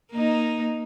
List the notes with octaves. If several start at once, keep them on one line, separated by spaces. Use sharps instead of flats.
A#3 D#4